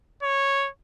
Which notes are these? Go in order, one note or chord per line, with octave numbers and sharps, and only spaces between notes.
C#5